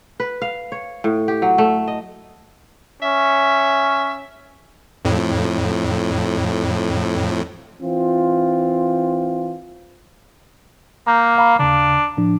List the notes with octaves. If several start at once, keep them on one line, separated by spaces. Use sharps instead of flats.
B4
F5
C#5
A2
G4
F#3
A3
D#5
C#4 E5
F2 A2
E3 C4 F4
A#3 A#5 G6
F5 A#5 B5
D#2 C#3 D4
A2 F3 D4